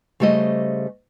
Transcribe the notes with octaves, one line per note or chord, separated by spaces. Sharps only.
C#3 G3 A3 C5 D#5